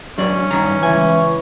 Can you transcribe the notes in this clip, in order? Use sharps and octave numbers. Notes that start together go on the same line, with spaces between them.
F#3 C#4 D4 D5
G2 D#3 A#5
C#2 E3 G#5